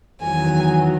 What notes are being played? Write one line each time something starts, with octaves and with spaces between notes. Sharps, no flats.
E2 D#3 F#3 G#5